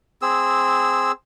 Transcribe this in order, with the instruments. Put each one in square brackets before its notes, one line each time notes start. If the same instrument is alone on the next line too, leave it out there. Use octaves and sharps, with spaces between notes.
[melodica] C4 G#4 E6